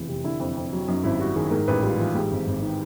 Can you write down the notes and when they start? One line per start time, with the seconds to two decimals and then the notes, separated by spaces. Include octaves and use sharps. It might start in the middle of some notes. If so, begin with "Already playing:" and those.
Already playing: F1 E2 E3 F4
0.09 C3
0.24 D3 E4
0.40 F2
0.56 F2
0.73 F#3
0.88 F#2 D#4
1.04 G#1 E4
1.19 G3 F#4
1.36 D#3 G#4
1.51 G#2 A#4
1.68 A1 B4
1.83 G3 F4
1.99 E3 F4
2.15 G#2 G4
2.31 G#1
2.47 G#1
2.62 D#3